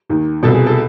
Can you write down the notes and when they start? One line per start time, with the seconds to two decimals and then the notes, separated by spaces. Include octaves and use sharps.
0.09 D#2 D#3
0.43 C2 B2 A4
0.54 G#4
0.66 A4